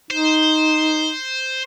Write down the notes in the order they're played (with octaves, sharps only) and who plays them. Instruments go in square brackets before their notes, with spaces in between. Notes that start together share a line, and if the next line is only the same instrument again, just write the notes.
[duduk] D#4 [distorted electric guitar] C5